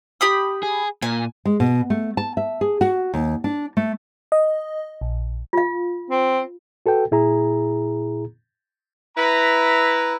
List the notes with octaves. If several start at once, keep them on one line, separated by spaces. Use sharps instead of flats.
G4 B5 D#6
G#4
A#2 G#5
G#3
B2
A3
A5
E5
G#4
F#4
D#2
D4
A3
D#5
A#1
F4 F5
C4
F#4 A4 B4 G5
A#2 E4 G#4 A#5
E4 B4 A#5